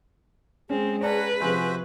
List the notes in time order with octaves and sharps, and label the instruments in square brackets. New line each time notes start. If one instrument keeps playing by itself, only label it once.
[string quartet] G#3 C4 [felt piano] C#4 [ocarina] G#4
[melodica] C#4 F#5 A#5 [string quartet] B4 [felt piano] D5 A5
[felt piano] C3 F3 G#5 [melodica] F#4 C5 E5